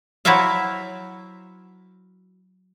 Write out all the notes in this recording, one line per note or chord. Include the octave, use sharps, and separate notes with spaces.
F#3 E4 F#4 C5 E5 F5